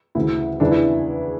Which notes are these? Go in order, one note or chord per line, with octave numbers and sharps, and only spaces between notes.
D2 C#3 E3 E4
E2 C#3 E3 D4
E4